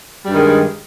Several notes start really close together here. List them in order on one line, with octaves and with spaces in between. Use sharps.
G3 G2 D#3 G#3